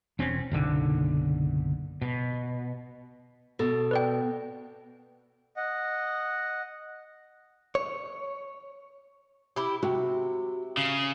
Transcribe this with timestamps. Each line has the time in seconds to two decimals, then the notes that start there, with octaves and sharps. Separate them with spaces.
0.19 E1 C4 C#4
0.52 F#1 B1 D3
2.02 B2
3.59 B2 B3 A4
3.91 B4 D5 G5
5.56 D#5 F#5
7.75 C#5
9.56 E4 G4
9.83 C3 F#4 G5
10.77 C#3